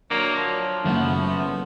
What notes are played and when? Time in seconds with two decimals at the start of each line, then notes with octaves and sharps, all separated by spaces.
0.10 F#3 A#3 D4 F#4 C#5
0.37 F3
0.84 F#1 F#2 A3 B3 F#4